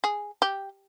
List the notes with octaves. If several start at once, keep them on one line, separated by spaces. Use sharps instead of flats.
G#4
G4